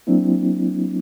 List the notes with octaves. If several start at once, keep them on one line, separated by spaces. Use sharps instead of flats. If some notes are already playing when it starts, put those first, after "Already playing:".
F#3 A#3 C4 D4 E4